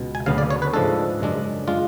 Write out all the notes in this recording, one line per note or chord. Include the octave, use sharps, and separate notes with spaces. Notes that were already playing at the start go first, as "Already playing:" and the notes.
Already playing: C#2 B2
G#5
D2 C#3 F#3 B3 F5
D5
C#5
B4
G#2 F3 G#3 D4 A4
F#2 C#3 G#3 D4
G#3 D4 F4